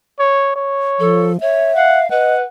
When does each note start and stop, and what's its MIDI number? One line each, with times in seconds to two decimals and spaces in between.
0.19 0.54 73
0.56 1.29 73
1.00 1.37 53
1.00 1.32 69
1.41 1.73 73
1.41 2.09 76
1.75 2.09 77
1.75 2.01 78
2.10 2.42 71
2.10 2.35 75
2.10 2.47 78